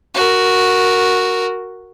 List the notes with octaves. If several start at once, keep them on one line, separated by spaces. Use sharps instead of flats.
F#4 A#4